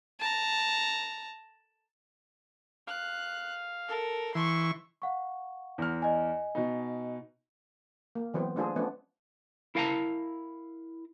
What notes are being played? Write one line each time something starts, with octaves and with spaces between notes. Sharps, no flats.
A5 A#5
F5 F#6
A4 A#4
E3 C6 C#6
F5 F#5 C#6
E2 F6
D#5 G#5
B2 D#4
A#3
E3 F#3 B3 C4
A3 D4 F4 G#4 C5
F3 A3 B3 C#4 D4
E4 A#4 F5 G5 A5 A#5